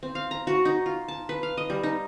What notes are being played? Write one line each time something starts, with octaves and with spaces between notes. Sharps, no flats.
C4
F5
A#5
F#4
D#4
F4
A5
B4
F5
D#5
G3
D#4